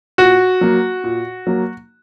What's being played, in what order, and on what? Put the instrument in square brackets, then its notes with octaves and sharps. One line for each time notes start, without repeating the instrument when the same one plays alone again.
[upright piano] A#2 [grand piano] F#4
[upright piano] F#3 A#3
A#2
F#3 A#3